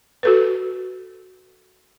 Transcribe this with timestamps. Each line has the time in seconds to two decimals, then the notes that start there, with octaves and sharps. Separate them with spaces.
0.23 F#4 A4 B4